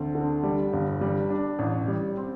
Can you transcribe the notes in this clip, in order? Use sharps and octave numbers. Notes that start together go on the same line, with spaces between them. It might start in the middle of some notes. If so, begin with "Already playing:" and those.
Already playing: D2 C4
D3
G3
G1
G3
D4
A1
G3
C4